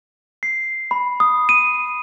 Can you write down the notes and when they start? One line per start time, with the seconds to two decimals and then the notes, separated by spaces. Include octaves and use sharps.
0.43 C7
0.91 B5
1.20 D#6
1.49 D#7